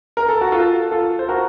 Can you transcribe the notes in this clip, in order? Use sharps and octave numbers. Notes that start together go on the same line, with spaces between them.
A#4
A4
F#4
F4 A4
F4 A4
C5
F#4 A#4